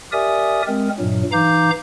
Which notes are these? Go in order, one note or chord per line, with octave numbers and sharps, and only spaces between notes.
G4 A#4 D5 E5 G#5 D#6
G#3 C4 A#4
G2 A#2 F#3
E3 D#4 F5 A#5 D6 G6